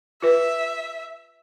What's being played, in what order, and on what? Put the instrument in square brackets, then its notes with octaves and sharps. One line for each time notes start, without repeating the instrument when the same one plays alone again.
[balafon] F4 B4 [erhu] E5